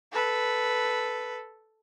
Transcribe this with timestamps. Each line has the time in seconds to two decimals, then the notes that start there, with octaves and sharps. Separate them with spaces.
0.13 A4 B4